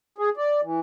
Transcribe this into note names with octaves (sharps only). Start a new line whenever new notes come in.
G#4
D5
E3